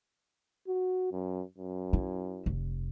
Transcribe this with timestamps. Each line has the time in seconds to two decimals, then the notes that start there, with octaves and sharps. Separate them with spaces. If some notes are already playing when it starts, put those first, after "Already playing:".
0.67 F#4
1.12 F#2
1.58 F#2
1.93 E4
2.46 F1